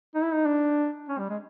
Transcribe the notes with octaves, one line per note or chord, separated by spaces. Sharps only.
D#4
E4
D#4
D4
C#4
G3
G#3